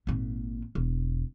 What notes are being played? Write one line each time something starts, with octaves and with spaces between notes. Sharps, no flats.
G#1 A#2
E1